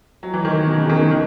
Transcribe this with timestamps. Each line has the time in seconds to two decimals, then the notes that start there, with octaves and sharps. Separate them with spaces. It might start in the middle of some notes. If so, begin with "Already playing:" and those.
0.23 F#3
0.34 E3
0.45 D#3
0.67 B2
0.78 C#3
0.89 D#3
1.01 B2
1.11 D#3